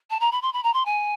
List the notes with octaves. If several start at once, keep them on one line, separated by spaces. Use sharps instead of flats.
A5
A#5
B5
C6
B5
A#5
C6
G#5